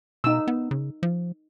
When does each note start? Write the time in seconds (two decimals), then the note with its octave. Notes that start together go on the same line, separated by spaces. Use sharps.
0.24 B2 D#4 E6
0.47 B3
0.71 C#3
1.03 F3